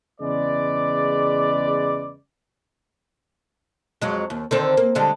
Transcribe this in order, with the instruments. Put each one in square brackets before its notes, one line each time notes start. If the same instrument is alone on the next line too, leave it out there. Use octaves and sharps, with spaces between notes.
[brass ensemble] E2 C#3 G#3 B4 D5
[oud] F2 F#3 G#3
D#2
D3 D#3 C4
A#3
D3 G3 G#3